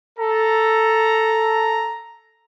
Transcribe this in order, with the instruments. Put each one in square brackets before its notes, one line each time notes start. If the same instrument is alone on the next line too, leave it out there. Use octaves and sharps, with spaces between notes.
[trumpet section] A4 [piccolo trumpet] A#5